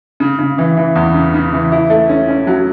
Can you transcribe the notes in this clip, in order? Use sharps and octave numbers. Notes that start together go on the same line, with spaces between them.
C#3
C#3
E3
E3
E2
C#3
C#3
E3
E4
A3
C#4
C#4
F#3